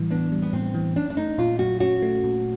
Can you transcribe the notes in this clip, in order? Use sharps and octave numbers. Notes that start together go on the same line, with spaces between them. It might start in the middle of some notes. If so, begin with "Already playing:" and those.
Already playing: A2 E3 G3
B3 D4
G3
B3
A2 C4
E3
C#4 D4
D4
A3 D#4
A#2 F4
F#3 F#4
C#4 F#4
A3
A#2